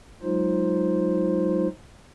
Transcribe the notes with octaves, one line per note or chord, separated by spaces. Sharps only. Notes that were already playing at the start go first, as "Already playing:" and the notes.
F#3 G#3 D#4 F4 C5